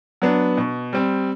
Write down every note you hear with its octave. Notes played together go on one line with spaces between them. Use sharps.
F#3 B3 D4
B2
G3 C4